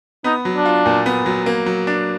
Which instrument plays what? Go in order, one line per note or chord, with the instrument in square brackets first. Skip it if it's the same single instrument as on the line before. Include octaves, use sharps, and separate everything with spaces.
[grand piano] B3 [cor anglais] D#4
[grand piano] F#3
[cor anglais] D4
[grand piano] F4
A#2
B3
F#3
A#3
F#3
D4